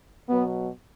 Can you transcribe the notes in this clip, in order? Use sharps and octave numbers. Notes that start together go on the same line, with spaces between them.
B2 F#3 B3